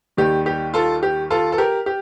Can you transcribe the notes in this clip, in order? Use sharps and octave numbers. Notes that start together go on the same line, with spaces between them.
D#2 D#3 G3 G4
G4
F4 A4
G4
F4 A4
A4
G4 A#4
G4